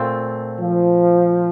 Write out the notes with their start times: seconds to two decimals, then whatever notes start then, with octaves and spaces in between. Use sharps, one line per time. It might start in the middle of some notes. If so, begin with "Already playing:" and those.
Already playing: A#2 A3 C4 F4
0.60 F3